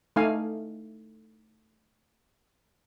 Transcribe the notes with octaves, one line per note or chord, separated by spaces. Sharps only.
A3 D#4 F5 G#5